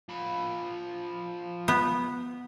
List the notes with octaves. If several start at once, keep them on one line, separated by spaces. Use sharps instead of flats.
F3 B5
B3